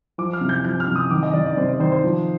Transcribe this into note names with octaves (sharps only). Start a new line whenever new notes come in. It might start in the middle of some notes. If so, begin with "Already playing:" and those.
F3 D6
F6
C3
G6
F3 G6
F6
C3
D#6
D#3 D6
D#5
D#3 D5
D5
C3 C5
D5
D#3 C5
C5
F3